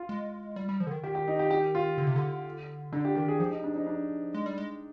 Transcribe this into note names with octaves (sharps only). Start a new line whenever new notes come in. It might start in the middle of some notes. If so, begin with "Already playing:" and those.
Already playing: F4
G#3
G3
G3
F3
D3
D#3
D#3 G4
G4
D#4
G4
G4
F4
D3
C3
D3
D3 D4
G4
D#3 G4
G#4
F3 G4
D#4
D4
D#4
D4
G#3
G3
G#3